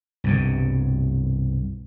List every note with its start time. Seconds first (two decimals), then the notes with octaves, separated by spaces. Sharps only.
0.24 C2 G2 B2